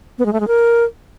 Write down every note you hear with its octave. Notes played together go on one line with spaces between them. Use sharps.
B3
G#3
A3
G#3
A#4